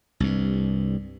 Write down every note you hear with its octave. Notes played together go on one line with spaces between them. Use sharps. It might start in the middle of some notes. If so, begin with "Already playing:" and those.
C2 G2